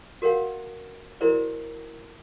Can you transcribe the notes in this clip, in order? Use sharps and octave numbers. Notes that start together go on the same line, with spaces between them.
F#4 A#4 B4 C#5 F5 F#5
E4 F#4 A#4 C5 D5